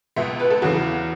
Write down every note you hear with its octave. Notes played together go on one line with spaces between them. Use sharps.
C#2 B2 E5
B4
A4
E2 C#3 E3 F#4